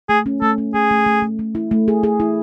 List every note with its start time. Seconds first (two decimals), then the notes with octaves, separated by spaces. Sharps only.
0.09 A3 G#4
0.26 C#4
0.42 A3 A4
0.58 C#4
0.74 A3 G#4
0.91 A3
1.06 A3
1.22 A3
1.39 A3
1.55 E4
1.71 A3
1.88 G#4
2.03 G#4
2.20 E4